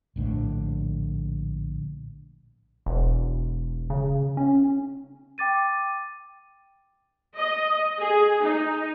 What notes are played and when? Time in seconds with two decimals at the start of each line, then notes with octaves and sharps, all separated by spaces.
0.16 A#1 A2 D3
2.86 E1
3.90 C#3
4.37 C#4
5.38 G5 D6 A6 D#7
7.36 D#5
7.99 G#4
8.44 D#4